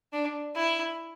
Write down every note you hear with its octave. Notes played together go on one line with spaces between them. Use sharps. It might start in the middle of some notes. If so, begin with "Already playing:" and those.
D4
E4